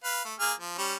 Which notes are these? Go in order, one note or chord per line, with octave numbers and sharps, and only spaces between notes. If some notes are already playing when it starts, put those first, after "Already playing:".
B4 F5
A3
A#3 G#4 F6
F3
G3 C#4